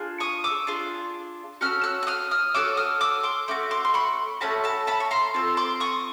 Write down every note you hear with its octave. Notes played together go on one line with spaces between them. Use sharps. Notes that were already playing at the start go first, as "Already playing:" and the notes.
Already playing: D4 F4 G#4
C#6 D#6
D6 E6
D4 F4 G#4
C#4 F#4 A4 F6
E6 F#6
F#6
D#6 F6
D#6 F6
C#4 F#4 A4 D6 E6
D#6 F6
D6 E6
C6 D6
A3 C#4 F#4 D6
C6 D6
C6
B5 C#6
A3 C#4 F#4 A5 B5
A5 B5
A5 B5
C#6
A#5 C6
C4 F4 A4
C6 D6
C#6 D#6